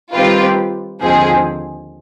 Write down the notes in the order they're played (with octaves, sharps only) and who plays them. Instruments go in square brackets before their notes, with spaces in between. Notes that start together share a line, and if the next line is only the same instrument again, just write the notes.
[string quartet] D#3 G3 C4 G4 B4 [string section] F4
[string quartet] D#2 D3 F3 G#3 C4 [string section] G#4